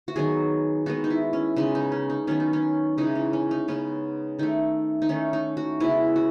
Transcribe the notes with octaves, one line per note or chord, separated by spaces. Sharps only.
F#4
D#3 F#3 B3 G#4
D#3 G#3 B3 F#4
D#4
E4
C#4
C#3 G#3 B3 D#4
D#4
C#4
D#4
D#3 F#3 B3 C#4
D#4
C#4
C#3 E3 G#3 D#4
C#4
C#4
D#4
C#3 G#3 B3 C#4
D#3 A3 D#4
D#4
D#3 A3 C#4
D#4
F#4
C#3 G#3 B3 E4
F#4